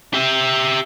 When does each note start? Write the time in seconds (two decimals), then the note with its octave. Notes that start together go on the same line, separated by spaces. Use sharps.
0.14 G4 E5